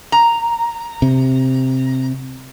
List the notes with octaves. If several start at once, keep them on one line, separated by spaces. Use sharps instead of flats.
A#5
C3